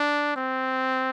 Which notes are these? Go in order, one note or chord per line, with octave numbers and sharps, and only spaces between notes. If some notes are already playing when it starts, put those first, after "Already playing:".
Already playing: D4
C4